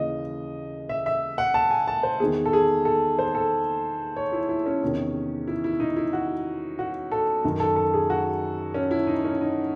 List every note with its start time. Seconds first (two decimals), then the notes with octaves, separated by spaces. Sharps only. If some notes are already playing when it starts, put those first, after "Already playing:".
Already playing: D#2 C#3 E3 D#5
0.89 E5
1.06 E5
1.38 F#5
1.54 A5
1.71 G#5
1.87 A5
2.03 C5
2.20 E2 D#3 G#4
2.45 A4
2.53 G#4
2.85 A4
3.19 C5
3.35 A4
4.16 C#5
4.32 E4
4.49 E4
4.66 C#4
4.83 E2 C3 D#3
5.47 E4
5.64 E4
5.80 D#4
5.96 E4
6.13 F#4
6.79 F#4
7.12 A4
7.44 F#2 D#3
7.60 A4
7.76 A4
7.94 G#4
8.10 F#4
8.74 C#4
8.91 E4
9.07 D#4
9.25 C#4
9.41 D#4